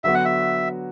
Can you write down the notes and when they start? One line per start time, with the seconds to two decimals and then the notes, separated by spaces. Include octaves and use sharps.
0.04 D3 F#3 B3 F#4 E5
0.14 F#5
0.25 E5